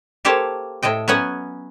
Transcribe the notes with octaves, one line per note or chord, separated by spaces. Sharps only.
A#3 G4 A4 C5 C#5 A5
A2 A4 D#5 G5
F#3 B3 C#4 F#5 G#5